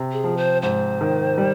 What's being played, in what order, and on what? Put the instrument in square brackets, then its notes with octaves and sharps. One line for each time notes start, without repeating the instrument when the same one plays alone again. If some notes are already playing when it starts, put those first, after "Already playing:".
Already playing: [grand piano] C3
[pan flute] G#4
[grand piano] F3
[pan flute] C5
[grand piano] G#2 [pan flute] C5
[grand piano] D#3
G3